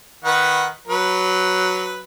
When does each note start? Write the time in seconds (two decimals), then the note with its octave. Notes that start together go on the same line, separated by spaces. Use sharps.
0.24 D#3 B4 F#5
0.88 F#3 B4